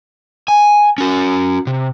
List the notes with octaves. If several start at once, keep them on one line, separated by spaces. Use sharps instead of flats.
G#5
C#4 F#4
C3